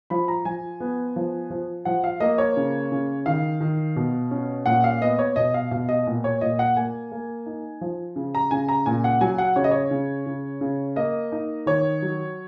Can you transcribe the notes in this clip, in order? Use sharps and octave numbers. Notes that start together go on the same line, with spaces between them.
F3 B5
A#5
F3 G#5
B3
F3
F3
F3 F#5
F5
A#3 D#5
C#5
C#3
C#3
D#3 F5
D#3
B2
C#4
A#2 F#5
F5
B3 D#5
C#5
B2 D#5
F5
B2 F5
D#5
A#2
C#5
A#2 D#5
F#5
A#3 G#5
A#3
D#4
F3
C#3
A#5
C#3 G#5
A#5
A#2 G#5
F#5
F#3 G#5
F#5
C#3 C#5
D#5
C#5
C#3
C#3
C#3
A#3 D#5
D#4
D#3 C#5
F#3